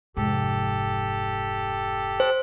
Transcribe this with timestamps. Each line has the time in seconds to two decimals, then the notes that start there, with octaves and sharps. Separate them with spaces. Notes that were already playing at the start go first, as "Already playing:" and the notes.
0.17 F1 G#2 G4 A4
2.20 C5